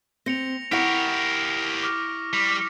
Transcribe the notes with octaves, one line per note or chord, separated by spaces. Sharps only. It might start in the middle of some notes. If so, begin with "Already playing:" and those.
C4 A#6 C#7 F7
E4 G4 A#4 F#5 C#6 F6
D6 F6 A#6
G3